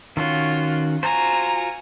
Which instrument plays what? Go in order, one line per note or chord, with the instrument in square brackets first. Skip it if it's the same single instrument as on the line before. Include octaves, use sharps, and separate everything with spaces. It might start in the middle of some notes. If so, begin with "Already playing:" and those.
[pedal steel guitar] D#3 C#4 F#4 [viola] F4
[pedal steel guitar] F4 F#4 C5 [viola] G#5 A#5